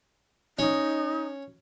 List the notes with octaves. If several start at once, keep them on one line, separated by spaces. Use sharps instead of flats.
C#4 D#4